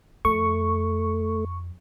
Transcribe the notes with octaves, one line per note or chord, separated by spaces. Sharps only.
F2 A3 C#6